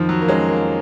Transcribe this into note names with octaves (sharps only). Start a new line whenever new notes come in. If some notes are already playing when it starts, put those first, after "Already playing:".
Already playing: F2 D#3 F3
F#3
A#3
G#3 C#4
A#3